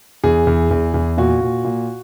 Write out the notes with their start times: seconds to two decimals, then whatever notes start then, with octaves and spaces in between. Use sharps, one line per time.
0.24 E2 G#4
0.47 E2
0.71 E2
0.94 E2
1.17 A#2 F#4
1.41 A#2
1.64 A#2